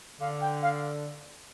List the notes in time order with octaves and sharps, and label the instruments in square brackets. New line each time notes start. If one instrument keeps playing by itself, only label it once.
[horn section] D3 [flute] F5
[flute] G5
F5